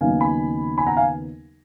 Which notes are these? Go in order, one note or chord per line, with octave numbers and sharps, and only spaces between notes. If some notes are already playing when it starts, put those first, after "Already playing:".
D#2 C#3 F#3 B3 D#4 F5 G#5
G#5 B5
G#5 B5
F#5 A#5
F5 G#5